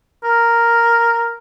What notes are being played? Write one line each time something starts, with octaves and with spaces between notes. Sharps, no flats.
A#4